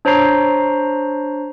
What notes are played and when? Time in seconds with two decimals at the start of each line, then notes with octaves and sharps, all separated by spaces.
0.05 D4 C5 C#5 A#5 C7